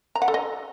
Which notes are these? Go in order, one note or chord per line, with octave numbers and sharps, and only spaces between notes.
A#5
F#5
A4
D#5